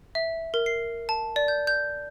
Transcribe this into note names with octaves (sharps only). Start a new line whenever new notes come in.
E5
A#4
C7
A5
D5
G6
G6